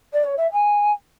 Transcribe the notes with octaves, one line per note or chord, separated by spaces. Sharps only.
D5
C#5
E5
G#5